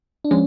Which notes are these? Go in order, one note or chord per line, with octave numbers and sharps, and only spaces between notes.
D4
F3 G#3 C#4